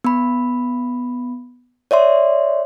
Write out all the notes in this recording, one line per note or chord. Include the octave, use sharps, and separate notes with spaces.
B3 B5
C#5 D5 E5 C6